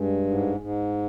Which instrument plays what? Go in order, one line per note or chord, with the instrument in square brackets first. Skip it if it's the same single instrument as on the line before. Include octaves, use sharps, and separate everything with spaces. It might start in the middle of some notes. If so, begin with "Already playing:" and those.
Already playing: [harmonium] G2 [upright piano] G#3
[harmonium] G#2
G#2